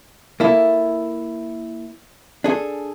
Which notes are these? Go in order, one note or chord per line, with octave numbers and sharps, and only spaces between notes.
A#3 E4 A4
D4 G#4 A4